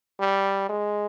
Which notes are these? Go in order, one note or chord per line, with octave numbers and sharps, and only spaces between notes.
G3
G#3